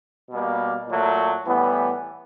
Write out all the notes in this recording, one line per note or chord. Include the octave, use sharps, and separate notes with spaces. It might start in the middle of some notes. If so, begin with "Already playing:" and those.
B2 G3 A#3
A#2 F#3 A3
A2 E3 G3 B3